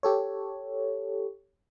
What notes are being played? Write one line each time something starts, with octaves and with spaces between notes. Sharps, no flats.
G4 A4 C#5